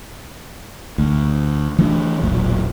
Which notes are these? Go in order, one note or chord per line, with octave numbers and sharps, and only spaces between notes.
D2
E3 A3 D4
E1 B1 A#2